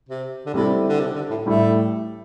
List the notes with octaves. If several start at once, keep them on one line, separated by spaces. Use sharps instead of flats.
C3
D3
C3 G3 C4 E4 A4
D3
C3
D3
A2
A2 G3 A3 E4 G4